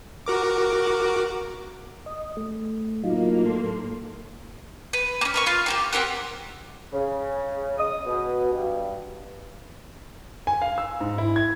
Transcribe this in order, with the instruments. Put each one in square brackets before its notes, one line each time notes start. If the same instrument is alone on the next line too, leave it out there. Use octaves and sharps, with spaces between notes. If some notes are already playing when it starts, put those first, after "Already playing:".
[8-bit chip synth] F#4 A#4 D6
[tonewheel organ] D#5
A3
[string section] A2 A#3 [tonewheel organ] F#3 D#4 F4
[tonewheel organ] A4 C6
[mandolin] B4
A#3 C#4
A#4 B4 C#6
F4 F5
A#3 F#4 G4
C4 G4 A#4 F#5
[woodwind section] C#3
D#6
B2
G2
[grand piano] G#5
F5
E6
G#2
E4
G#6